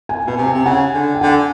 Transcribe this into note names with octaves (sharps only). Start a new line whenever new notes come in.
G#5
B2 G#5
C3
G#5
C3
C#3 F#5 G#5
D3
G5
D3 F#5 G#5